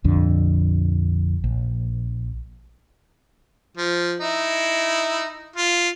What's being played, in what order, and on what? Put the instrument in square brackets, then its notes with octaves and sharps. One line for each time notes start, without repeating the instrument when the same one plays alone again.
[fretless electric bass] A#1 F2 D3
A#1
[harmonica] F3
D#4 E4
F4